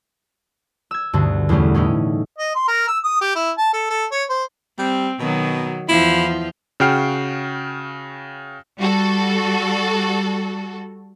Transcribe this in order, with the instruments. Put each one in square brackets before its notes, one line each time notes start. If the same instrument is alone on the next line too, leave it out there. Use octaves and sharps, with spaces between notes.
[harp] E6 G#6
D2 G2 B2 D3
E2 B2 G3 A3 C#4
A2 C#4 D#4 E4
[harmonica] D#5
C6
A#4
E6
D#6
G4
E4
A5
A4
A4
C#5
C5
[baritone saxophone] G3 [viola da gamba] C4
[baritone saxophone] B2 [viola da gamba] D#3 F#3
[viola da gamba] E2 F3 F4 [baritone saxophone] E4
[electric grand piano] C#3 F#4 G5 F6 C7
[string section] G3 F#4 A4